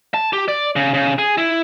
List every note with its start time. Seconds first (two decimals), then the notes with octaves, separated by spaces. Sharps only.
0.14 A5
0.33 G4
0.48 D5
0.76 C#3
0.94 C#3
1.18 G#4
1.38 E4